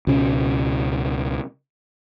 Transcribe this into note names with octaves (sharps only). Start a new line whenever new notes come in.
C#2 B2 C#4